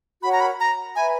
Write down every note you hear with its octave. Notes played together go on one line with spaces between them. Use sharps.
F#4 A#4 C#5 F#5 B5
A#5
B5
A#5
B4 E5 G#5 B5